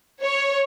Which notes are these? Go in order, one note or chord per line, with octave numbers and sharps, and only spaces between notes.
C#5